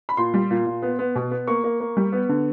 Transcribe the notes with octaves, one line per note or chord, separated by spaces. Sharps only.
B5
A#2 C6
G3
A#2
A#2
B3
B3
B2
B3
A#3 C#6
A#3
A#3
G3
B3
D3